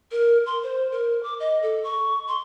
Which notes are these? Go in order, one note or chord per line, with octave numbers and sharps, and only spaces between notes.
A#4
C6
C5
A#4
D6
D#5
A4
C#6
C6